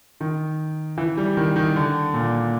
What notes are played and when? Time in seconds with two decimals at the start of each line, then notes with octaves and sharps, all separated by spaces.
0.21 D#3
0.98 E3
1.18 G3
1.37 D#3
1.56 D#3
1.76 D3
2.14 A#2